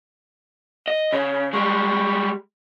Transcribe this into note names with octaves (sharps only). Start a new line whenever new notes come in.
D#5
C#3 C#5
G3 G#3 C#6